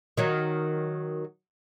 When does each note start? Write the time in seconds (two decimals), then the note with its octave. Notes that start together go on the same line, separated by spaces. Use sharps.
0.17 D#3 F#3